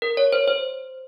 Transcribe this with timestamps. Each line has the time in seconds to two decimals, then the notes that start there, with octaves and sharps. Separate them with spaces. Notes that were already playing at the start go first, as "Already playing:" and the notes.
0.02 A#4
0.17 C#5
0.33 C5
0.48 C5